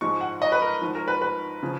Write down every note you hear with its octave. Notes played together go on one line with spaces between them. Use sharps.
G#1 G#2 F3 G#3 C#6
F#5
D#5
B4
A#4
G#1 G#2 F3
A#4
B4
B4
C#3 F3